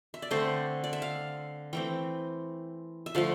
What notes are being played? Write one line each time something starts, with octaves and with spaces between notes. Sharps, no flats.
E5
D5
D3 A3 C4 C5
D5
E5
F5
E3 A3 C4 G5
E5
D3 F3 A3 F5